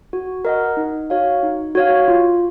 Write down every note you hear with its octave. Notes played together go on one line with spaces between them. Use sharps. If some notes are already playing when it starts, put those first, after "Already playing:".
F#4
A#4 D#5 F#5
D#4
F#4 C#5 F5
D#4
F#4 C#5 F5
F4